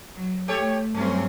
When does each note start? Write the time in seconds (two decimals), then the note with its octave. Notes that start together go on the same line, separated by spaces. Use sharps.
0.15 F#3
0.48 A3 G4 A4 C#5
0.94 G2 F#3 A3 C4 C#4